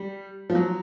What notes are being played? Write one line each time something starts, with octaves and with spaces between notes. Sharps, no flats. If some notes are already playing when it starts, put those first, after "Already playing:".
Already playing: G3
F3
F#3